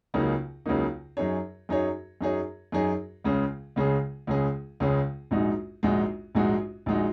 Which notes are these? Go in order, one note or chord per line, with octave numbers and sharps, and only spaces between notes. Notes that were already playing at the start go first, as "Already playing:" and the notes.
C#2 C#3 F#3 A#3 D#4
C#2 C#3 F#3 A#3 D#4
F#2 F#3 D#4 G#4 C#5
F#2 F#3 D#4 G#4 C#5
F#2 F#3 D#4 G#4 C#5
F#2 F#3 D#4 G#4 C#5
C#2 C#3 G#3 C#4 G#4
C#2 C#3 G#3 C#4 G#4
C#2 C#3 G#3 C#4 G#4
C#2 C#3 G#3 C#4 G#4
A#1 G#2 G#3 D#4 F#4
A#1 G#2 G#3 D#4 F#4
A#1 G#2 G#3 D#4 F#4
A#1 G#3 D#4 F#4